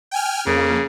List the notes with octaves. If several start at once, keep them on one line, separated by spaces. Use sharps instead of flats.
G5 G#5 F6
F2 C#3 A#3